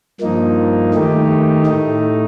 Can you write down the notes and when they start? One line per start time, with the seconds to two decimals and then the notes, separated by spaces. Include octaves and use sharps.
0.20 G2 F3 A#3 D#4
0.94 D#3 A3 D#4 G4
1.66 A2 A3 D#4